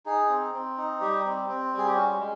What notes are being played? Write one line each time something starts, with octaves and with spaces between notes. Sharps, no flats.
D#4 G#4
C4
C4
D#4
G3 G4
C4
C4
G3
G#4
G4
C#4 F#4
G#3